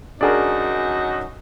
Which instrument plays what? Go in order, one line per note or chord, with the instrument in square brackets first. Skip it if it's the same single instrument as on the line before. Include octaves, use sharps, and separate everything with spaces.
[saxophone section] F#2 D#4 F#4 [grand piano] D4 G#4 A#4